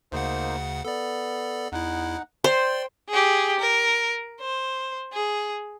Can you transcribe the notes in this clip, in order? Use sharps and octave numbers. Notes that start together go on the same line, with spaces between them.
D2 C#3 A#3 D#4 C5 F#5
B3 A4 D5
E2 D#4 E4 F#5
C5 D5 G5 C6
G4 G#4
A#4
C5
G#4